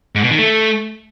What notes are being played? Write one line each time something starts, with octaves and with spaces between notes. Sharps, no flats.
G#2
B2
D#3
A3